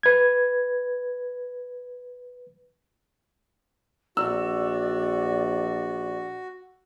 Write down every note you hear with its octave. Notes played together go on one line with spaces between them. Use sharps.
B4 G#6
A#1 F#4 D5 E6